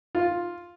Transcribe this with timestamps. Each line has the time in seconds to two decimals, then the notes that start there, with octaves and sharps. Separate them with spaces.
0.15 F4